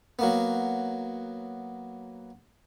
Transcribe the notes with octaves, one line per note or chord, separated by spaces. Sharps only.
F#3 A#3 B3